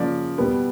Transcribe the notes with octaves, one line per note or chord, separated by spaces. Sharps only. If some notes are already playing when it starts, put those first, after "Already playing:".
Already playing: C#3 F3 A#3 D5
B2 G3 B3